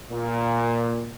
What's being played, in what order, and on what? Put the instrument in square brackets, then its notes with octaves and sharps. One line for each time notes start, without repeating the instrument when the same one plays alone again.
[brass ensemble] A#2